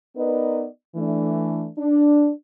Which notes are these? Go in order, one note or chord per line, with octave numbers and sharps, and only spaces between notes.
B3 D#4 A#4 B4 D5 D#5
E3 A3 D4
D4